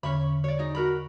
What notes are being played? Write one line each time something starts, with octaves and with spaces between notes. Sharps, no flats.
E2 D3 C#4 C#5 B5
C#5 D5
D#4 G#4
F#4 A#4 B5